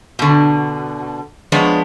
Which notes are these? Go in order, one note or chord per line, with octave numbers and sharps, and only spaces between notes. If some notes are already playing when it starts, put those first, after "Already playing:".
B2 D3
F3 G#3 B3 D4 C#5